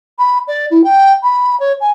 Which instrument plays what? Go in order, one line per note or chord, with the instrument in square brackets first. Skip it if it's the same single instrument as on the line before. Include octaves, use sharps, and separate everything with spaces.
[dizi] B5
D5
E4
G5
B5
C#5
G#5